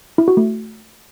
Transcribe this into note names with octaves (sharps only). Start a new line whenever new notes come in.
E4
F#4
A3